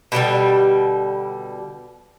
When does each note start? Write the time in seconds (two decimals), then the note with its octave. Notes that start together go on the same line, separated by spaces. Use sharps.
0.12 B2 D3 E3 G3